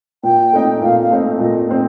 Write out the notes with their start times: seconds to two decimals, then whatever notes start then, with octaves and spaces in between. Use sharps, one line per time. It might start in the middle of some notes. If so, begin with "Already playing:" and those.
0.24 A#2 G5
0.53 A3 C4 D#4
0.82 A#2 F5
1.01 F5
1.11 A3 C4 D#4
1.39 A#2 D#5
1.68 A3 C4 D#4 G5